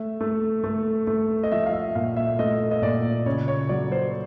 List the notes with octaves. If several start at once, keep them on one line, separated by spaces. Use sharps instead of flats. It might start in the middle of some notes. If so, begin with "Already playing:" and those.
Already playing: A3 E5
A3
A3
A3
D#5
F3 E5
F5
E5
A#2 F5
E5
A3 D#5
D#5
A#2 D5
C#3 C#5
C#5
F#3 D5
C5